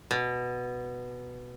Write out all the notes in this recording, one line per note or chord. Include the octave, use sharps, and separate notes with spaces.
B2